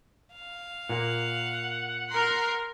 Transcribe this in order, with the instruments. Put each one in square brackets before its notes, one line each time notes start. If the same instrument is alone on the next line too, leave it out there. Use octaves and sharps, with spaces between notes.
[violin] F5
[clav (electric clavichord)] A#2 A#3 [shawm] F#5
[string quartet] A#4 A#5 C6